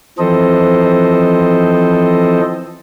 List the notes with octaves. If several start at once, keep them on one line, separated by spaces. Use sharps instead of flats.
E3 F3 C4 A4 C5 D#5